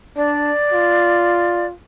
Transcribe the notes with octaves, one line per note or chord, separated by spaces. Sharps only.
D4 D5
F4